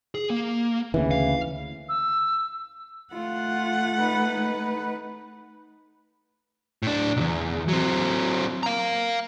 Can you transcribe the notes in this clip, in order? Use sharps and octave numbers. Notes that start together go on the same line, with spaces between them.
G#4
A#3
D2 C#3 E3
F5
E6
A3 F4 F#5
D#4 B4
A2 D4
B1 E2
F#3 C4
F5 A#5